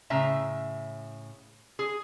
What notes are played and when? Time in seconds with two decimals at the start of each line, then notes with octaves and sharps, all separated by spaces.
0.10 A2 C#3 E5 A#5
1.79 G#4